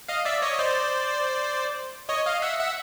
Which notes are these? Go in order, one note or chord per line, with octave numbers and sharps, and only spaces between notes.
D#5 F5
D5 E5
C#5 D#5
D#5
C5 D5
C#5 D#5
D#5 F5
E5 F#5
E5 F#5